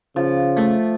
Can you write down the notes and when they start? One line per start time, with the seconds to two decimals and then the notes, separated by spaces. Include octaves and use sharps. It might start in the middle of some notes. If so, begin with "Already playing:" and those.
0.16 C#3 F3
0.57 A3